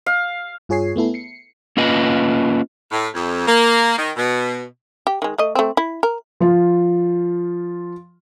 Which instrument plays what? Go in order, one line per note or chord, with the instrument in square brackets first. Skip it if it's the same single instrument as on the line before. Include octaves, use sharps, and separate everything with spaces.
[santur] F5
[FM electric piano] G2 F4 G#4 C#5 G#5 C7
A3 B3 E4 A4
C7 C#7
[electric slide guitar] A#3 C#4 F4 B4 D#5
[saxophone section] A2
F2
A#3
D#3
B2
[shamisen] G4
D#3 G#3
A3 D#5
A3 C4
E4
A#4
[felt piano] F3 F4